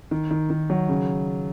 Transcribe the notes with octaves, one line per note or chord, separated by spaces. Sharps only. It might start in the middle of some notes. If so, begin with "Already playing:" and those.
D#3
D#3
D#3
F#3
C#3